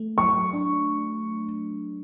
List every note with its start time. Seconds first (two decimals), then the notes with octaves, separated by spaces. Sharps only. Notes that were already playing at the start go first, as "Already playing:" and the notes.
Already playing: A3
0.18 F#3 C#6
0.53 D4